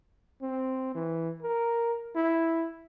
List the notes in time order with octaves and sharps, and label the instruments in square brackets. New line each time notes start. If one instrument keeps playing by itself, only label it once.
[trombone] C4
E3
A#4
E4